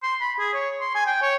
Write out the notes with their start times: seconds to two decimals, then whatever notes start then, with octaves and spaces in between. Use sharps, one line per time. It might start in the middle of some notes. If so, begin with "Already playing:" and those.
0.03 C6
0.21 B5
0.39 G#4
0.54 C#5
0.80 C6
0.94 G#5
1.06 G5
1.22 C#5